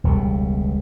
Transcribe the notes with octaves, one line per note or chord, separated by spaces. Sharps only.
E1 C#2 B2 G3